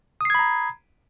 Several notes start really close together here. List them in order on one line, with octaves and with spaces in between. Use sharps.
D#6 C7 G#6 B5 A#5